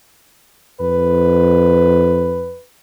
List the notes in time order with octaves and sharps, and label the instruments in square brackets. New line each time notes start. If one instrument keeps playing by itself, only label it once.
[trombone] F2 [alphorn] B4